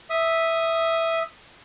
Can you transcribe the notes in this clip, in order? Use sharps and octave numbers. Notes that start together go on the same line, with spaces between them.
E5 D#6